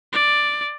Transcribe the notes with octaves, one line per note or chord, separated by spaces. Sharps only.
D5